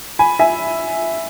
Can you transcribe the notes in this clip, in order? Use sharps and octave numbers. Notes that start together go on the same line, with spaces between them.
G#5 B5
E5 G#5